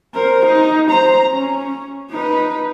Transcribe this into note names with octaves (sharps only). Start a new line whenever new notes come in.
A#4 C5
D#4
C5 A#5
C#4
D#4 B4